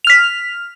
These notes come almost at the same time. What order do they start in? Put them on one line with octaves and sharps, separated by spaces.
F7 F6 B6